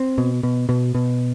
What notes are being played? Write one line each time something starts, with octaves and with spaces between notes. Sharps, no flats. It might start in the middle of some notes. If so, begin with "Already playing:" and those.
Already playing: C4
B2
B2
B2
B2